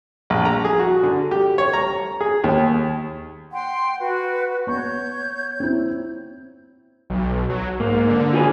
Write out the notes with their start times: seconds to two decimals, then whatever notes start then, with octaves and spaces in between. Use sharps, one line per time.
0.30 A#1
0.45 A#5
0.65 G#4
0.79 F#4
1.03 D3
1.31 G4
1.58 C#5
1.73 A#5
2.21 G#4
2.44 D#2
3.52 F#5 G5 C6
4.00 F#4 B4
4.67 B3 C#5 C#6 G6
5.60 C4 E4
7.10 B1
7.50 F#3
7.80 G#2 A#3
8.09 D3
8.33 F4 G#4 B4